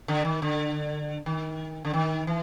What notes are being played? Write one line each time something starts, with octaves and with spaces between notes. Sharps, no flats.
D3
D#3
D3
D#3
D3
D#3
E3